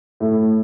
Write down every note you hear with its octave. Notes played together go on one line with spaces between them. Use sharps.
A2